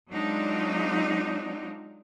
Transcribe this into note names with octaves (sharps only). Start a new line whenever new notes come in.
F#3 G#3 C4 D4 D#4 F4